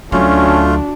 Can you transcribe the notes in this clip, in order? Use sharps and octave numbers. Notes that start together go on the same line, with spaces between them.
D2 F#3 A3 C#4 D4 F4 F#4